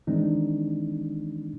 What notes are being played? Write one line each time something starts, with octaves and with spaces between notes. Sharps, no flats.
D#3 E3 G#3 C4 D4 D#4